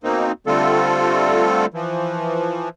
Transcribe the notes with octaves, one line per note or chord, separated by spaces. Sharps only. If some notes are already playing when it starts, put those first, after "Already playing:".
B2 A#3 C4 D#4
D3 G3 A3 C4 F4 A4
E3 F3